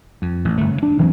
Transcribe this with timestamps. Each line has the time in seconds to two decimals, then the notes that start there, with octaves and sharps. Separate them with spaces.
0.22 F2
0.45 A1
0.58 G1 A3
0.71 C#3
0.83 D4
0.98 E1 E3 F#3 C4